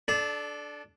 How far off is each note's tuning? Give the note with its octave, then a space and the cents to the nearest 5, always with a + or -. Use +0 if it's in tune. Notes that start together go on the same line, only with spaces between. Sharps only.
D4 +0 A4 -25